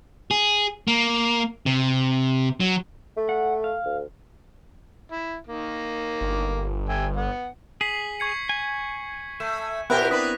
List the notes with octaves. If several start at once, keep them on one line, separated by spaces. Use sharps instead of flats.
G#4
A#3
C3
F#3
A3
F#5
F5
D2
E4
D#3 A#3
G1
E5 G5 G#5
B3 F#5
G#4 B6 C7 F#7
C#6 G#6 C#7
G#5
A3 E7
A#2 B3 C4 E4 G4 A#4 F#6 A#6
D4 B4 D#6 B6